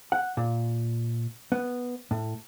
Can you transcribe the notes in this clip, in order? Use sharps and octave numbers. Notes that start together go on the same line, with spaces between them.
F#5
A#2
B3
A2